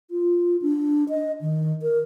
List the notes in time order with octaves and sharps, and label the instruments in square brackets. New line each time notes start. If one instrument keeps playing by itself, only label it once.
[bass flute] F4
D4
D#5
D#3
A#4